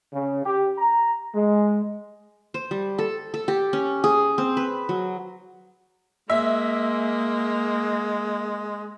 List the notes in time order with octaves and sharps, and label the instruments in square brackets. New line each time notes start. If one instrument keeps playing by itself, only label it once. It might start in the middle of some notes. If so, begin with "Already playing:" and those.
[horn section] C#3
G4
A#5
G#3
[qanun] C5
G3
A4
A4
G4
C#4
G#4
C4
B4
F#3
[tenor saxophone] G#3 [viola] A#3 [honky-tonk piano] E5